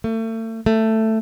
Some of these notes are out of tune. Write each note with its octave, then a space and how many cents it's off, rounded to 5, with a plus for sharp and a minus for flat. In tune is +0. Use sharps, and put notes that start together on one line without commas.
A3 +35
A3 +10